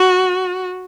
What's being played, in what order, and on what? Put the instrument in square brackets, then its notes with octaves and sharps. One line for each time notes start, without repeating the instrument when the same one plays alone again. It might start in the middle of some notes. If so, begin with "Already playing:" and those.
Already playing: [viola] F#4